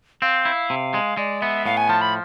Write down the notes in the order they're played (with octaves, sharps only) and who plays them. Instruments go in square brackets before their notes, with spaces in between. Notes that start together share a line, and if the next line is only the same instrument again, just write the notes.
[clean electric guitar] C4 [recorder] F5
[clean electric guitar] E4
C3
G#3
[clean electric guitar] G#3 [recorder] D5
[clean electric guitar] B3 [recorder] E5
[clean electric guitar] A2 [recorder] F5
[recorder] G#5
[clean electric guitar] F3 [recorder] A5
[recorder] B5